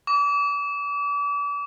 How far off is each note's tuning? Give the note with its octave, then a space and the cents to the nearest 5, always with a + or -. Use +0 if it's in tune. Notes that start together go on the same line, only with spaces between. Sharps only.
D6 -40